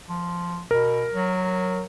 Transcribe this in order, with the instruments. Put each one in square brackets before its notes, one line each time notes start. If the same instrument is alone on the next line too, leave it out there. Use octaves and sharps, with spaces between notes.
[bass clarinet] F3
[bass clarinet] B2 [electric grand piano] A#4
[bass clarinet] F#3